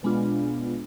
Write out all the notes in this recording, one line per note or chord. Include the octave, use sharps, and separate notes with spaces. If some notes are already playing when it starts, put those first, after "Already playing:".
B2 G#3 B3 D4 F4